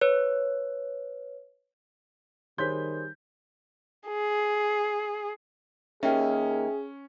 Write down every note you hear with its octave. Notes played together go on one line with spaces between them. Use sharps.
B4 C#5
D#3 G3 G#4 C5 C#5 C6 G6 B6
G#4
D#3 A#3 C#4 D#4 G#4 E5 G5